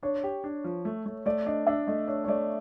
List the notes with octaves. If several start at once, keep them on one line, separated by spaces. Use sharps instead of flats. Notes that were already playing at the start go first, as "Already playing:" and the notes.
D4 C#5
G4
D4
F3
A3
A3
A3 D5
D4 D#5
D4 E5
A3 D#5
D4 C#5
C#5
A3 D5